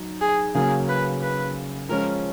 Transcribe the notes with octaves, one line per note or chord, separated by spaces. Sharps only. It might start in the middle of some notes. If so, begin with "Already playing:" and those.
Already playing: F#3 D#4
G#4
C#3 F#3 A#3 C#4 G#4
B4
B4
F3 G#3 C#4 F4 A#4